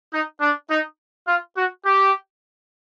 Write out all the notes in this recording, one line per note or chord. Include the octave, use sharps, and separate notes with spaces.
D#4
D4
D#4
F4
F#4
G4